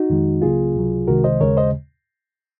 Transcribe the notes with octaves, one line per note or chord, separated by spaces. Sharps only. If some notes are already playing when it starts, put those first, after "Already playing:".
Already playing: D#4 F#4
F2 D#3 G#3
C#2 C#3 F#3 A#3 F4 G#4
C#2 C3 F#3
C2 C3 D#3 G#3 F#4 A#4
C5 D#5
D#2 C#3 G#3 A#4 C#5
C5 D#5